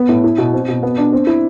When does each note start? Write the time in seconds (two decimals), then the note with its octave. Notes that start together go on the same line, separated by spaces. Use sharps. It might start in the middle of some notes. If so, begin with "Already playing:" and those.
Already playing: B3
0.09 A2
0.24 E4
0.38 B2
0.53 C4
0.68 B2
0.83 B3
0.97 D4
1.12 C4
1.27 E4